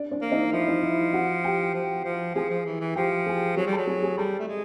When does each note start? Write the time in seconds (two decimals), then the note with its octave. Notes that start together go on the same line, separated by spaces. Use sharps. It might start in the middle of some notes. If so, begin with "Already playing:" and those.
Already playing: D4 D5
0.11 D4 D5
0.22 A#3
0.32 D#4 D#5
0.52 F3 E4 E5
0.68 D#4 D#5
0.83 E4 E5
1.13 F#4 F#5
1.44 G4 G5
1.74 F3
2.05 F3
2.35 F3 G#4 G#5
2.50 F3
2.65 E3
2.81 E3
2.95 F3 G4 G5
3.27 G#4 G#5
3.57 F#3 G#4 G#5
3.67 G3
3.73 F#3 A4 A5
3.87 G#4 G#5
4.02 G#4 G#5
4.18 G3 A4 A5
4.39 A3
4.48 G#3